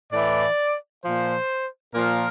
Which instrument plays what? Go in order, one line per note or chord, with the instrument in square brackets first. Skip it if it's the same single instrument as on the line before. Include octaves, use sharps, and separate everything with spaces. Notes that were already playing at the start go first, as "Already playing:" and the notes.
[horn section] A2 E3 D5
A#2 F3 C5
A#2 F3 A#4